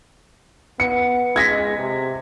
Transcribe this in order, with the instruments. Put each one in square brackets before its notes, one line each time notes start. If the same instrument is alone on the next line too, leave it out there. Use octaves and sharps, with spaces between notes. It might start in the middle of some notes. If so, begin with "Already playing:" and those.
[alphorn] B3 [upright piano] C#7
[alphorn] G#3 [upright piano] G#6 A#6 B6
[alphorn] C3